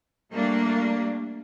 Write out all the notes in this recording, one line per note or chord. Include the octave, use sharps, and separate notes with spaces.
G3 A3 A#3 D4